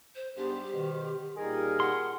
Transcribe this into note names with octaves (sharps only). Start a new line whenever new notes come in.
C5
G#2 G3 B3 D4 G4 C5
B2 D#3
A#2 G3 D#4 G#4 A#4
F#5 C6